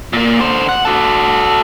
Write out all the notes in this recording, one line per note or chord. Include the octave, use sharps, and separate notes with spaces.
A#2 A#3
D3 C5
F#5
F#4 A4